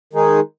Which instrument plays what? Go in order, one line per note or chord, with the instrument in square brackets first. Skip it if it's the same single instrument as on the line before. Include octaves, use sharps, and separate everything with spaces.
[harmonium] D#3 G#3 D#4 G#4